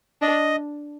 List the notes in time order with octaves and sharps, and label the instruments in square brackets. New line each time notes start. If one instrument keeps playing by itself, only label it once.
[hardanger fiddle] D4 [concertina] D#5